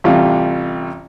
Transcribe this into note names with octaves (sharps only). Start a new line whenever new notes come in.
A1 C3 G3 F4